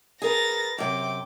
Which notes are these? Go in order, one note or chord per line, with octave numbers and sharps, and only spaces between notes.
G#4 A#4 B4 A6 A#6
F#2 C3 G5 D6